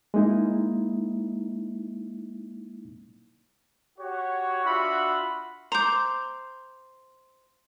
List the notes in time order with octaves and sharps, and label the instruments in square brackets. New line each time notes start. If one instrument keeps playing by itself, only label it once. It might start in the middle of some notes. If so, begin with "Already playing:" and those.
[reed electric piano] G#3 A#3 D#4 E4
[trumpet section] F#4 G4 C#5
D4 F4 F#4 E5 F#5 B5
[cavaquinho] C5 D6 [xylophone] A#5 G6